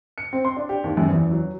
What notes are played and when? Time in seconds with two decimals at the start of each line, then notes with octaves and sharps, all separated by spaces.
0.18 C#7
0.33 C4
0.45 C6
0.56 D4
0.69 G4
0.84 D#2
0.97 F#2
1.08 E2
1.31 F#3